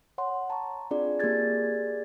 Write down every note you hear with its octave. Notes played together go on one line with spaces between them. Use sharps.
C#5 F#5 C6
A5 A#5 C6 C#6
C4 D4 F4 G#4 D5
A#3 G4 G#4 D5 G#6 A6